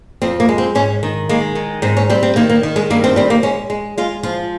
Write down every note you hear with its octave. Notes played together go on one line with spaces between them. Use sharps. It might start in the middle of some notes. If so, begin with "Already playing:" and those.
F2 C4
A#3
G#3
C4
G#2 C#4
D#3
G#3 A#3
D#3
G#2 C4
C#4
G3 C4
C4
D#3 A#3
A#3
D#3
G#3
G2 A#3
C4
G3 C4
A#3
G#3 C#4
G#3
G#3 F4
F3 F4